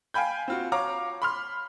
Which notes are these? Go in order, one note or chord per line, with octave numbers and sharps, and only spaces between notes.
F5 G5 G#5 B5 G6
C4 F4 F#4
C#5 F5 A#5 D6
B5 C6 F6